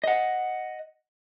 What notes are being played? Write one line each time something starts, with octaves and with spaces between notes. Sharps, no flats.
D#5 F#5